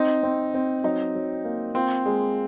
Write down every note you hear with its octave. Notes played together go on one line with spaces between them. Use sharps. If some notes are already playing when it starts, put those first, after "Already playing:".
Already playing: C4 D#4
C4
C4
F#3 D#4
F#3
A#3
C4 F4
G#3